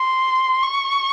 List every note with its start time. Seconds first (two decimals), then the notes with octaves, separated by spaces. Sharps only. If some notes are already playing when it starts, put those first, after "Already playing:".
Already playing: C6
0.62 C#6